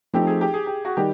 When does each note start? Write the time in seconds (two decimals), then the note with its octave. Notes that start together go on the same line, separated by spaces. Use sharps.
0.13 F3 A3 C4 D#4 G4
0.27 G#4
0.41 G4
0.53 G#4
0.67 G4
0.85 F#4
0.97 D#3 G3 G4